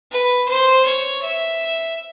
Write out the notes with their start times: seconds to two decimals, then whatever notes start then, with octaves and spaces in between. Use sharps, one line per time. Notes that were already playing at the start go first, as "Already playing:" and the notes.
0.11 B4
0.49 C5
0.85 C#5
1.23 E5